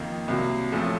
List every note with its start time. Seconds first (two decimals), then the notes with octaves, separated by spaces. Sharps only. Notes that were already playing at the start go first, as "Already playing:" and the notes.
Already playing: F2 D#3 A#3 D#4
0.28 C2 C3 F#3 A#3
0.72 A1 A2 F3 A3